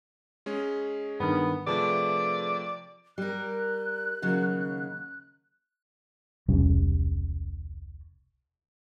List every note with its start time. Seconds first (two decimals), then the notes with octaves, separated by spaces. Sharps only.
0.46 G#3 C#4 G#4
1.20 G2 D#3 B3
1.67 C3 F3 A3 G#4 B4 D5 A5
3.18 G3 A#4 F#6
4.22 D#2 C#3 F#3
6.48 E1 C2 G3 C#4